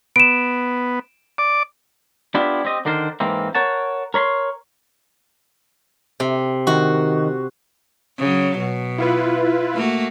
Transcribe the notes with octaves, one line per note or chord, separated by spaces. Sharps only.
B3 D7 E7
D5 D6
B3 D4 E4 F4 G4
C4 G4 D#5
D3 D#3 D4 A#4 C5
G#2 E3 A#3 C4
A#4 C#5 F#5 A5
A#4 C#5 B5 C6
C3
D#3 F#4
C#3 F#3
B2
E4 F4 B4
A3 A#3 F#4